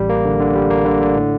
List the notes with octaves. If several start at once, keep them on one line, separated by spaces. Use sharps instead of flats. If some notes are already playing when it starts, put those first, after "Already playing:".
Already playing: A1 G3
A#3
D3
D3
G3
A#3
D3
D3
A2